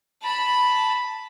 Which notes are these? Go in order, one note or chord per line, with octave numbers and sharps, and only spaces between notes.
A5 B5